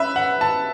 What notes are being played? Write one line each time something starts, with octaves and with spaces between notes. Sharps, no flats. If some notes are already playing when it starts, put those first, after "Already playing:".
Already playing: C#4 B4 E5
F#5
A5